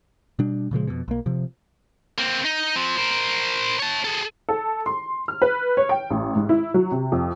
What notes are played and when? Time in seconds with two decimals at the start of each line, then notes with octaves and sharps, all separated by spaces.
0.39 B2 G3 D4
0.71 A#2 C#3 F3 G#3
0.87 F2 B2
1.08 B1 A#3
1.26 C3 F3
2.18 A#3 C4
2.45 D#4
2.76 F3 C4
2.97 A#4 C5
3.79 C#5 A5
4.05 G#4 A4
4.49 A4
4.86 C6
5.28 F6
5.42 B4
5.77 C#5
5.89 G5
6.10 A1
6.35 G#2
6.49 E4
6.74 F#3
6.92 C3
7.12 F2